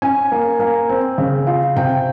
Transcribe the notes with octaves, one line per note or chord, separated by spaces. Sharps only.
C#4 G#5
A#3
A#3
C4
C#3
F4
C3 G5